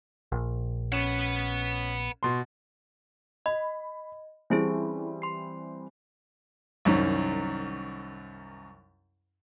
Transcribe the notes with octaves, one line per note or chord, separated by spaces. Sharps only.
A#1
C#4 B4 F#5 E7
B2 C6
D#5 B5
E3 G3 C4 C#4 E4 G#4
C6 C7
C2 F#2 D#3 C#4